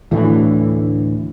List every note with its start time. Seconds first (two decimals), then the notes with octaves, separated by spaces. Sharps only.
0.11 D2 A2 D3 E3